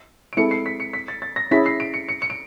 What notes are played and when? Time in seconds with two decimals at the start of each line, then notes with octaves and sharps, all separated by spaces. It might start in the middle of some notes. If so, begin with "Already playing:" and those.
0.33 D7
0.37 G#3 C4 E4 A4 C#7
0.51 C7
0.66 B6
0.80 C#7
0.93 B6
1.08 A6
1.22 A6
1.36 A#6
1.51 C#4 E4 G#4 B6
1.66 C7
1.80 D7
1.94 C#7
2.09 C#7
2.22 C#7
2.30 D7